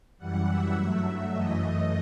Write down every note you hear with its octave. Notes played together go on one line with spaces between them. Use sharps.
F#2 E3 G3 F#5
E5
G2 F#3 A3
F#2 E3 A3 D#5